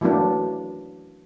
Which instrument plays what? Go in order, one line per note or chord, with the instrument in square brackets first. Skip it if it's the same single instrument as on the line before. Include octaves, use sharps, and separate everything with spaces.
[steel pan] E3 F#3 A3 A#3 D4